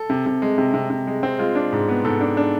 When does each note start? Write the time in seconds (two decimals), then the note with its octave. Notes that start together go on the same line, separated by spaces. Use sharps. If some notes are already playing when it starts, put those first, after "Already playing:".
Already playing: A4
0.10 C3
0.26 C3
0.42 G#3
0.58 C3
0.74 C3
0.90 C3
1.07 G#3
1.23 C4
1.39 G#3 F4
1.55 D4
1.72 G#2
1.88 B3
2.04 G#2 A4
2.21 D4
2.37 D4